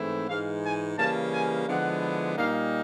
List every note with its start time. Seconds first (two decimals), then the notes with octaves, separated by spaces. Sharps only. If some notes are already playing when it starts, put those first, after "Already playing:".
Already playing: G#2 E3 A3 C4 E4
0.28 G#2 E3 G#3 F5
0.64 G#5
0.98 C#3 E3 G3 A#3 A5
1.33 G#5
1.67 D3 F3 G#3 B3 E4 F#5
2.38 A#2 G3 A#3 D#4 F5